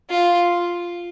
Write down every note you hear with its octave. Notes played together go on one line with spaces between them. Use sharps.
F4